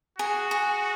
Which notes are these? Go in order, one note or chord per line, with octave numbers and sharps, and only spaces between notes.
F#4 G#4
G#4